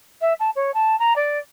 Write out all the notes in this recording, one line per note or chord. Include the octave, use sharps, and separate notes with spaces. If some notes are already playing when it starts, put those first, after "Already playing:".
E5
A5
C#5
A5
A#5
D5